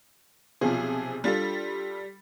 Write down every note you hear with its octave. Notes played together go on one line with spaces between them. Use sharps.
B1 C3 F3 G#4
G3 D4 F4 A4 A6